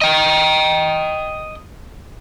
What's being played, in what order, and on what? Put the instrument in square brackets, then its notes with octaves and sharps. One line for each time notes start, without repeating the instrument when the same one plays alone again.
[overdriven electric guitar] D#5 G5